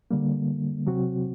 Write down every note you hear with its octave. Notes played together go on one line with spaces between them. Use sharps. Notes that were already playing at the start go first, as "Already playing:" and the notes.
D3 G3 A#3
C3 F#3 C4 F#4